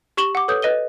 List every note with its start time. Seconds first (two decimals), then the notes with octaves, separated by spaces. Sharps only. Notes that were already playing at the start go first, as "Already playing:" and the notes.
0.17 G4 C#6 E7 F#7 G7
0.35 F#5 D6
0.48 A4 B4 C#5 D#6 G6
0.62 B4 D#5 D#7 G7